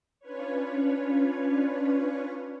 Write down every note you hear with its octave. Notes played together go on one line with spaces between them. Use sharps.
C#4 D4 F4 B4 C#5